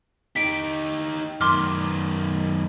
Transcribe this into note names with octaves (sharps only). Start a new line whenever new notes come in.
D#4 G4 B6 D7
F#2 D#3 C6 D6 F6